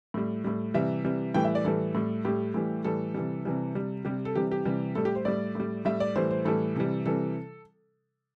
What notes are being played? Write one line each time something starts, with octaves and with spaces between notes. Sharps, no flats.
A2 G3
A2 G3
C3 E3 G3 E5
C3 E3 G3
A2 E3 G3 G5
E5
D5
A2 E3 G3 A4
A2 G3
A2 G3 G4
A2 E3 G3
A2 E3 G3 A4
C3 E3 G3
C3 E3 G3
C3 G3
C3 G3 G4
A4
C3 E3 G3 G4
G4
C3 E3 G3
A2 G3 A4
G4
C5
A2 G3 D5
A2 G3
A2 G3 E5
D5
A2 E3 G3 C5
C5
A2 E3 G3 A4
C3 E3 G3
C3 E3 G3 A4